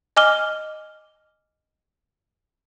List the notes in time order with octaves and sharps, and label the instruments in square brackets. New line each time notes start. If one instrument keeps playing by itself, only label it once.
[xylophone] D#5 G#5 D6 F6 G7